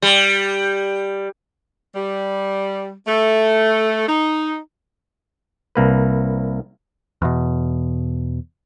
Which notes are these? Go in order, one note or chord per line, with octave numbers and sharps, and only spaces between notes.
G3
G3
A3
D#4
C2 A#3 B4
E2 B2